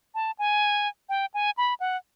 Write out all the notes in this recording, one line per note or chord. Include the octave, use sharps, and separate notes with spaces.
A5
G#5
G5
G#5
B5
F#5